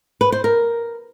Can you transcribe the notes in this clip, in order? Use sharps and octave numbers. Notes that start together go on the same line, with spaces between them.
B4
C5
A#4